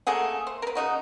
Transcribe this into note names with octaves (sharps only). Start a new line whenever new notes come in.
A3 A#3 G#4 F#5
C5
A#4 B4
C#3 D#4 F#4